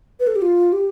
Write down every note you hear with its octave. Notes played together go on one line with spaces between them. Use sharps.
B4
A4
G4
F4
G4